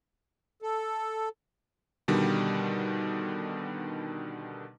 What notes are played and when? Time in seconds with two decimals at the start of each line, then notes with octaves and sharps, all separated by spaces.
0.62 A4
2.08 B2 D3 D#3 G3